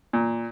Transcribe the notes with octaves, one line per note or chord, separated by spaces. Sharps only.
A#2